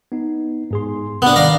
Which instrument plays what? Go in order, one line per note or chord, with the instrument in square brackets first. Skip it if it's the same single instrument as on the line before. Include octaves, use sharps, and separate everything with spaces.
[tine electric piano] B3 D#4
G#2 G#4 C6
[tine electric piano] C3 F#6 [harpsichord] B3 D4
[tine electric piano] D#3 [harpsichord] D5 F5 A#5